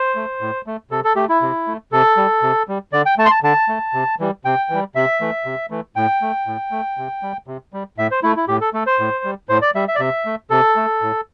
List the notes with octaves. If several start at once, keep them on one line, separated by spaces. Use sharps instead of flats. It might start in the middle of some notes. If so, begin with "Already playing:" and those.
Already playing: C5
A3
A2
A3
C3 A4
A4
A3 G4
E4
C3
A3
C3 A4
G3
C3
G3
D3 D5
G5
A3 A5
C6
A5
D3 A5
A3
C3
E3 G3
C3 G5
E3 G3
C3 E5
E3 A3
C3
E3 A3
A2 G5
A3
A2
A3
C3
G3
C3
G3
A2 E5
C5
A3 E4
E4
A2 G4
A4
A3 A4
C5
A2
G3
A2 C5
D5
G3 E5
E5
D5
C3 E5
A3
C3 A4
A3
A2